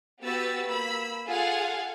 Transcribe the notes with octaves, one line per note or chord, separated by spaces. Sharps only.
B3 F#4 G4 B4 E6 A6
A#3 B5 E6
F4 G#4 A4 F5 F#5 G#5